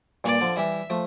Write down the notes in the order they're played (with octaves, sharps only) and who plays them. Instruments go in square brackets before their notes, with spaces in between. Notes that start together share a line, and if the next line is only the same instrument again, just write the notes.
[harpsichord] G2 A#2 [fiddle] D5
[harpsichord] D3 F3
[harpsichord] E3 G3 [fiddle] E5
[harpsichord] F3 A3